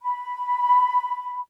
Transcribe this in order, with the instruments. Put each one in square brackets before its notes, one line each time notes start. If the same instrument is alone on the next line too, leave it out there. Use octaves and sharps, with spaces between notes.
[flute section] B5